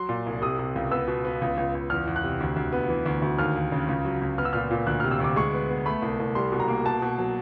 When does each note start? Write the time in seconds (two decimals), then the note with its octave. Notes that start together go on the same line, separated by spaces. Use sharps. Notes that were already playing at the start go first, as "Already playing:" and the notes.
Already playing: F#3 C6
0.09 A#2
0.26 C2
0.42 C3 D#6
0.59 C3
0.75 C#2
0.91 B3 E6
1.08 B2
1.25 B3
1.41 C#2
1.57 C#2
1.75 C#2
1.90 E2 F6
2.07 E2
2.16 F#6
2.24 C3
2.40 D2
2.56 D2
2.72 B3
2.89 E3
3.06 D2
3.22 D2
3.39 D#2 F6
3.56 D#2
3.72 C#3
3.88 C#2
4.05 F#3
4.22 C#2
4.38 B3 F6
4.45 E6
4.53 A#2 F6
4.71 A#2
4.87 D2 F#6
5.00 C3 F6
5.11 E6
5.20 D2 D6
5.36 G#3 C#6
5.53 B3
5.69 B3
5.86 A3 B5
6.02 C2
6.20 C2
6.35 G3 C6
6.52 B2
6.60 A#5
6.68 A#3
6.85 B2 A5
7.02 B2
7.18 F#3